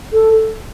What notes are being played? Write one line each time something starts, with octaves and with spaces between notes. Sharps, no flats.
A4